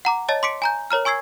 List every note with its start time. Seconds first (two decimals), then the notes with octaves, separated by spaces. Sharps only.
0.05 F#5 A#5 D6
0.29 C#5 D#5 A5 A6
0.43 C6 D6 B6 C#7 D7
0.62 G#5 A#5 G6
0.91 A#4 C#5 A#5 F6
1.05 G#5 C#6 E6 G#6 C7